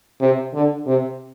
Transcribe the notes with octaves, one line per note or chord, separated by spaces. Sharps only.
C3
D3
C3